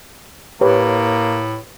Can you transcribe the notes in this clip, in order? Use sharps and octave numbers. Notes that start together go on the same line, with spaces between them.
A2 A#3 G4 B4 C#5